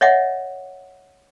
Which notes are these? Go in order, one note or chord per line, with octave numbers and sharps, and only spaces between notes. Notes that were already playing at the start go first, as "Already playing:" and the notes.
C#5 D#5 E5 F#5